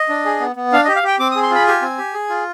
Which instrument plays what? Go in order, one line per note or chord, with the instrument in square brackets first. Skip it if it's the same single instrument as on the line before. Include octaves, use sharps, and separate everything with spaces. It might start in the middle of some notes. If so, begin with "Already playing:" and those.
Already playing: [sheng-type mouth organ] D#5
D4
G#4
B3
B3
D4 F5
G4 D#5
F5
G4 G5
C4 D6
D#6
G#4
C6
F4 B5
G4 G#5
C4
G4
G#4
F4